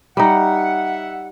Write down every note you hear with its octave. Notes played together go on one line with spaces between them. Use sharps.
G3 D#4 E5 F#5